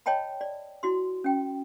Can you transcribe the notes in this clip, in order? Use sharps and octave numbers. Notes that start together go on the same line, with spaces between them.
C#5 D#5 G5 A5 B5
D5
E4 F#4 C6
C#4 G5